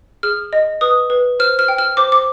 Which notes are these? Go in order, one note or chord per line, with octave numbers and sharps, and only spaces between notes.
G#4 F6
D#5
B4 D#6
B4
C5 F6
F6
G5
F6
C5 D6
D6